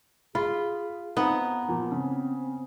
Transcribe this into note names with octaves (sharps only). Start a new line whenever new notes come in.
F4 G#4 B5
B3 C4 D#4 A#5
A#2 F3
C#3 C4